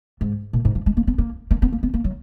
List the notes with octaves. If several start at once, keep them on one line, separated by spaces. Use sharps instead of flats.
G#2
A#2
G#2
F3
G#3
A#3
B3
A#3
A#3
B3
A#3
B3
A#3
F#3